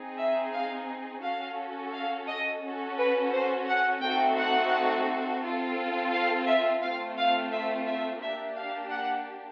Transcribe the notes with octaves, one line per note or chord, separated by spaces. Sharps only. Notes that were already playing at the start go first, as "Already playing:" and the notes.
Already playing: C4 D#4 G#4
E5
F5
C#4 F#4 A4 F5
F5
D#5
C#4 F#4 A4
B4
C5
F#5
A3 C4 D#4 F#4 A4 G5
F#5
C4 F4 A4
F5
E5
A3 C4 F4 F5
F5
E5
E5
A#3 D4 G4 E5
F5
F#5